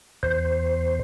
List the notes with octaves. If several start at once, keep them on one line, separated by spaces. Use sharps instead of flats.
E2 C5